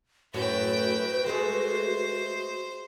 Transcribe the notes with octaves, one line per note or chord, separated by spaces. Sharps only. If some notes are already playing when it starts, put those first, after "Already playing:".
F#2 A2 E4 F#4 B4 C#5 G5
G#3 A3 G#4 C5